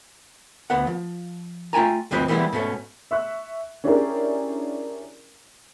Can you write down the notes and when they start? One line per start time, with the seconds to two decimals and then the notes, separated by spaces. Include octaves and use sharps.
0.70 D2 B3 F#5
0.87 F3
1.73 A3 F4 G5 G#5 A#5
2.11 D2 G2 F3 C4 B4 D#5
2.28 E3 G3 G#3 B3 E4
2.53 G#2 B2 A3 C#4
3.11 E5 C#6 F#6
3.84 C#4 D4 E4 G4 G#4 A#4